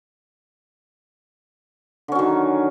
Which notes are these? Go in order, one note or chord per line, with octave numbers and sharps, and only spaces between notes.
D3 D#3 F#3 C#4